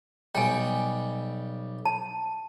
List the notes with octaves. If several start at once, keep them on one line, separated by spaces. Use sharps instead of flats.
B1 G3 G5 G#5
A5